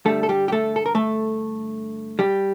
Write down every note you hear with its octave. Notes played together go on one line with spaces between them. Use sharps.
G2 D3 G3 A3 A4
A4
G3 G4
G4
A3 A4
A4
A#4
A3 A4
G3 G4